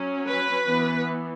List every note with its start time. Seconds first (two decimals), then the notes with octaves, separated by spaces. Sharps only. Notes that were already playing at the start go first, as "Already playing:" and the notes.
Already playing: F#3 C#4
0.26 B4
0.66 E3 B3